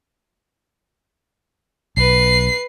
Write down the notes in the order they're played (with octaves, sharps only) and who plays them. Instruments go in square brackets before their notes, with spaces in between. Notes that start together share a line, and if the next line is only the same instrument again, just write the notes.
[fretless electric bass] B1 [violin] B4 C7